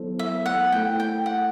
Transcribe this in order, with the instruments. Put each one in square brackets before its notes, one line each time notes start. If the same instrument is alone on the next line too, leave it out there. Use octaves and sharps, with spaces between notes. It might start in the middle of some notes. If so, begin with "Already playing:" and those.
Already playing: [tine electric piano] F#3 B3 E4 A4 C5
[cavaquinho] E5
F#5
[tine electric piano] A3 E4 A4 [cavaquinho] G5
[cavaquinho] G5
F#5